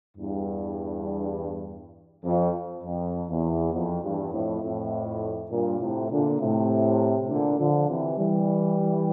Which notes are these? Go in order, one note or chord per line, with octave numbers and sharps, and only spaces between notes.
E2 G2
F2
F2
E2
F2
E2 G2
F2 A2
F2 A2
G2 A#2
A2 C3
A#2 D3
A2 C3
A#2 D3
D3 F3
C3 E3
E3 G3